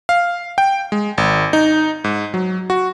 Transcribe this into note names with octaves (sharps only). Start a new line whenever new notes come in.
F5
G5
G#3
G#1
D#4
G#2
F#3
F#4